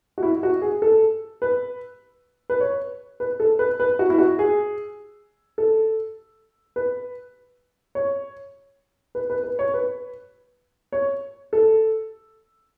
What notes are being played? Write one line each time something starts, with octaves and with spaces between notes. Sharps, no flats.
F#4
E4
F#4
G#4
A4
B4
B4
C#5
B4
A4
B4
B4
F#4
E4
F#4
G#4
A4
B4
C#5
B4
B4
B4
C#5
B4
C#5
A4